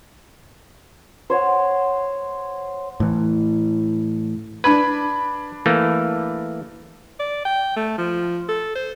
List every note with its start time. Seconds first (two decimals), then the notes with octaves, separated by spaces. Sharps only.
1.30 C5 C#5 F#5
3.00 A2 E3
4.64 D4 B4 B5 G#6
5.66 E3 A3 A#3
7.20 D5
7.45 G5
7.76 A3
7.98 F3
8.49 A4
8.75 C5